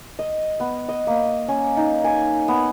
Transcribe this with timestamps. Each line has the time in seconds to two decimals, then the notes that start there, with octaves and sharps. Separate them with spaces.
0.19 D#5
0.60 B3
0.89 D#5
1.07 A#3
1.48 C#4
1.77 D#4
2.04 G#5
2.48 B3